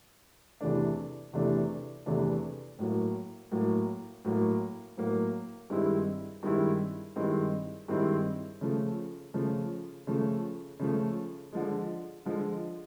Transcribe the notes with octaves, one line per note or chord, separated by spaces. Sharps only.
E2 C3 E3 A3 D4
E2 C3 E3 A3 D4
E2 C3 E3 A3 D4
A2 F#3 A#3
A2 F#3 A#3
A2 F#3 A#3
A2 F#3 A#3
G2 D#3 G#3 C4 E4
G2 D#3 G#3 C4 E4
G2 D#3 G#3 C4 E4
G2 D#3 G#3 C4 E4
C#3 F3 A3
C#3 F3 A3
C#3 F3 A3
C#3 F3 A3
D3 F3 G#3
D3 F3 G#3